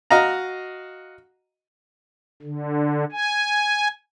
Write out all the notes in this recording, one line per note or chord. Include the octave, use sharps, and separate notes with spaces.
F#4 D#5 F5 A#5
D3
G#5